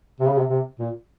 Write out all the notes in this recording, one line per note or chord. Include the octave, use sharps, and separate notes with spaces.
C3
C#3
C3
C3
A#2